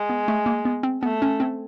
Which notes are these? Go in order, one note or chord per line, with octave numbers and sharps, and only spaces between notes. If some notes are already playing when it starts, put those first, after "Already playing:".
Already playing: G#3
B3
A3
A#3
B3
C4
A3 B3
C#4
C4